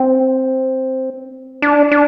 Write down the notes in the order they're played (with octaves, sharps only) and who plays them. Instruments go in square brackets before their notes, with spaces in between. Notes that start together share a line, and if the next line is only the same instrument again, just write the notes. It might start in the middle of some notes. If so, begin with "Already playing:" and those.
Already playing: [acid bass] C4
D4
D4